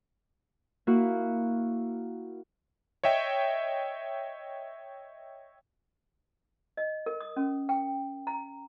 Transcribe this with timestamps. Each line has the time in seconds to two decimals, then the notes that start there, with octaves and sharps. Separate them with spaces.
0.87 A#3 E4 F#4
3.04 C#5 D#5 E5 G5
6.77 D#5
7.06 A#4
7.20 D#6
7.37 C#4
7.69 G5
8.27 A#5